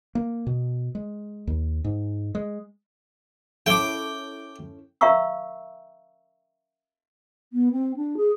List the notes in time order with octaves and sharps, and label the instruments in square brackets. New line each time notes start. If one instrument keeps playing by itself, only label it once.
[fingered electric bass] A#3
B2
G#3
D#2
G#2
G#3
[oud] C#4 E4 A4 [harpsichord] G5 D6
[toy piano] A#4 E5 F5 A#5 C#6 E6
[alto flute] B3
C4
D4
G#4